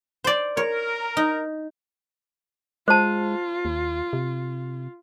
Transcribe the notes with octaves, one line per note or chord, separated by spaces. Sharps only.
C5 D5
A#4 C#5
D#4
G#3 F4 C5 A5
D#2
C3